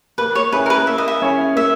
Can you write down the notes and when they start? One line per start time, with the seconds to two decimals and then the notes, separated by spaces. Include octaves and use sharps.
0.18 A#3 B4
0.35 C#5
0.52 C#4 E4 G#4 B4 C#5
0.66 A#4
0.70 B4
0.87 A#3 E5
0.98 D#5
1.08 E5
1.22 C#4 E4 G#4 C#5
1.56 A#3 E5